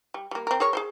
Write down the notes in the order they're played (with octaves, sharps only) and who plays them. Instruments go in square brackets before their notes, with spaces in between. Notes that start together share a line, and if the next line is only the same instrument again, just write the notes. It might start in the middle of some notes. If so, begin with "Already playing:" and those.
[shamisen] G3
G3 A#3
C4 A#4
G#4 A#4 C#5
G#4 A4 C5